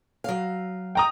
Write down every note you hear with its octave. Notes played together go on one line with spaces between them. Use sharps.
F#3 F5
G5 A#5 D#6